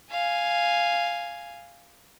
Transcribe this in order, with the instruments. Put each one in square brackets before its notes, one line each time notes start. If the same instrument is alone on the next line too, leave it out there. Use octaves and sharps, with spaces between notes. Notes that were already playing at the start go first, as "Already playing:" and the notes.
[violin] F5 G#5